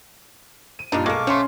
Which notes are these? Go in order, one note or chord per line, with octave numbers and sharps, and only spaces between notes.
D#7
G2 A#2 D4 D#4 F4
B1 G#3 A#3 A4 F5 A5 C#6 D6
A3 C#4 C5 C#5 C6